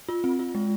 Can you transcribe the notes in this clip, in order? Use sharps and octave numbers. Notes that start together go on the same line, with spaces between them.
F4
C4
F4
G#3